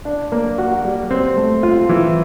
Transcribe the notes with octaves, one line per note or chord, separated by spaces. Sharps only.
D4
A#3
F#4
G3
C4
A3
F4
E3